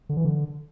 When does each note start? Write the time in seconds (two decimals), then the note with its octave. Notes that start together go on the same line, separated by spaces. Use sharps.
0.09 D3
0.17 E3
0.25 D3